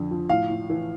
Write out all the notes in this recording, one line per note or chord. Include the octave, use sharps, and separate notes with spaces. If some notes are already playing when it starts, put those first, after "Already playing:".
Already playing: F2 D3
F3
A2 F5
A2
E3